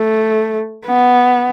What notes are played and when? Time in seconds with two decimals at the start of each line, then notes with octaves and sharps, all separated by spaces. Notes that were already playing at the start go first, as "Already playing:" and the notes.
Already playing: A3
0.86 B3